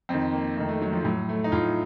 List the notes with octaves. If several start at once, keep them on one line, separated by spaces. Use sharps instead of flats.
F2 D#3 C4
A#3
F2 D#3 A3
A3
F#3
F3
A2 F#3
A3
D#4
A2 F4